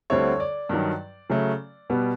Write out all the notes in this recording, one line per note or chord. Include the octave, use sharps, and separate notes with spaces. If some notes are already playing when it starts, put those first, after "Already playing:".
D2 D3 G3 C4 E4 C#5
D5
G2 D#3 F#3
C#3 F#3 A3
B2 G3 B3